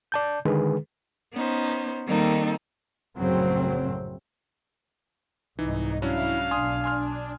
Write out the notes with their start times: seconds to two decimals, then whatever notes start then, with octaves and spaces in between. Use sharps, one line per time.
0.12 D5 A5 G6
0.45 D3 D#3 G#3 G#4 B4
1.33 B3 C#4 D#4 C5
2.07 D#3 G3 A#3 C4 D#4 A4
3.18 A#1 F#2 A2 C#3 F#3 C4
5.59 C2 G#2 E3 D#4
6.02 F#3 C#4 D4 E4 F5
6.51 B1 D4 G#5 C6 D#6
6.84 G#5 C6 F6